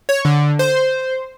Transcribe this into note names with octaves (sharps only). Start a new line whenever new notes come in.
C#5
D3
C5